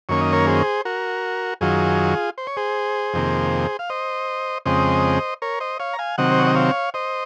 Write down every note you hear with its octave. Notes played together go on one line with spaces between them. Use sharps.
F#2 D#3 A#3 C#4 C#5
D#5
A#4 C#5
G#4 C5
F#4 A#4
F#2 D#3 F#3 F4 G#4
C5
C#5
G#4 C5
F2 C3 D#3 A#3
F5
C5 D#5
F2 C#3 G#3 C4 C5 D#5
A#4 C#5
C5 D#5
C#5 F5
A#5
F5 G#5
C3 D#3 F#3 C4 D#5 F#5
C5
C#5
D#5
C#5 F5
C5 D#5